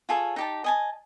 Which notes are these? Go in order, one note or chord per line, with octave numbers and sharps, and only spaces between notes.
F4 G#4 A4 C#5
D#4 G4 A5
D#5 G#5 A5